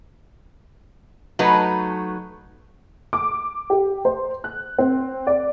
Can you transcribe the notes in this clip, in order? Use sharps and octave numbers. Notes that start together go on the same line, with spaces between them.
F#3 A3 D#4 B4
D6
G4
C5
F#6
C4
D5